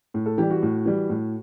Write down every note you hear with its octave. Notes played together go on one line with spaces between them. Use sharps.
A2
A4
E3 G3 G4
F#4
A2
E3 G3
A2